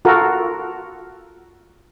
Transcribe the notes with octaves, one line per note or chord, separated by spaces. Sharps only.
F4 F#4 A4 A#4